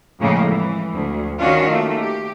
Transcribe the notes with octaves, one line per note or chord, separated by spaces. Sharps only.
F2 A2 C#3 G#3 A#3
E3
D2
D#3 C#4 D4 F4 F#4
A3 A#3
G4